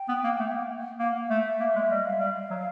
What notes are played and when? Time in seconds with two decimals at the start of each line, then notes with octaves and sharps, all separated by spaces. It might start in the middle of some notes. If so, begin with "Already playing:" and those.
Already playing: G5
0.08 B3
0.24 A#3
0.39 A3 F#5
0.54 A#3
0.99 A#3 F#5
1.10 F#5
1.19 F5
1.29 A3 E5
1.60 A#3
1.75 G#3
1.89 G3 D#5
2.05 F5
2.12 E5
2.19 G3 F5
2.50 F#3